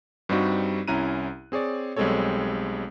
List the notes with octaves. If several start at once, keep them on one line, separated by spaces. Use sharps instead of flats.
G2 G3 C4 D#4 F#4
C2 C#4 E4 A#5 F#6 D#7
C4 G#4 C#5 D5
B1 G3 G#3 C4 A4 C#5